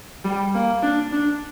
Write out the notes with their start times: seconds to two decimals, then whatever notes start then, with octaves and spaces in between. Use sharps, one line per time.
0.25 G3
0.55 A#3
0.83 D4
1.13 D4